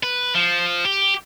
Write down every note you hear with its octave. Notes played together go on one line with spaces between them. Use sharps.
B4
F3
G4